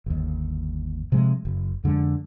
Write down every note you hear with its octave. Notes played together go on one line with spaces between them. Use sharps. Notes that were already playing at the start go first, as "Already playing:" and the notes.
G1 D#2
C3 F3 G#3
F#1
F2 D3 G#3